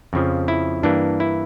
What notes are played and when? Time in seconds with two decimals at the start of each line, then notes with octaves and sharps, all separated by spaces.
0.13 F2 C#3 F3
0.48 E4
0.83 G2 E3 A#3 D4
1.20 E4